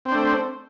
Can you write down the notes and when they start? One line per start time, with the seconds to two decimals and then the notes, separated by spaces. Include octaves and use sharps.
0.05 C4
0.08 C5
0.12 D4
0.15 A3